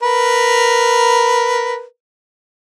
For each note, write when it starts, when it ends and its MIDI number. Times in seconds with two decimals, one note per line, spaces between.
0.03 1.83 70
0.03 1.83 71